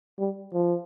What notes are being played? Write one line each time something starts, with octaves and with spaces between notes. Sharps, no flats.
G3
F3